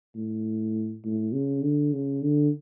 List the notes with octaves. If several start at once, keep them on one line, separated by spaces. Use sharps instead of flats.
A2
A2
C#3
D3
C#3
D3